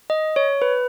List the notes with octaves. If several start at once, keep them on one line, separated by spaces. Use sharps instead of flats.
D#5
C#5
B4